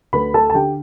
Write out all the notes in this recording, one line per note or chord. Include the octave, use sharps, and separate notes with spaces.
D2 B4 B5
A4 A5
A5
D3 G4 G5